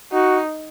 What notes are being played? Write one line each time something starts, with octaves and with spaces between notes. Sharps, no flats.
D#4 F#4